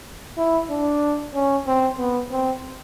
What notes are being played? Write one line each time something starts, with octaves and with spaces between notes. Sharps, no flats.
E4
D4
C#4
C4
B3
C4